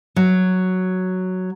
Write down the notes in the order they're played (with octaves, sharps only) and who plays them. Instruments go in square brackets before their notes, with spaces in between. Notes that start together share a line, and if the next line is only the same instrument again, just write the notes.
[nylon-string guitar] F#3